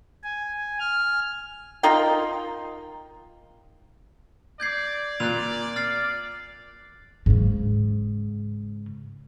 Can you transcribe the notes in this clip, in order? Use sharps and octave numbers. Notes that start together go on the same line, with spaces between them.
G#5
F6
D#4 F4 A#4 G5
D5 G6 G#6 C7
A#2 F#6 F7
F6 A6 C7
G#2 C#3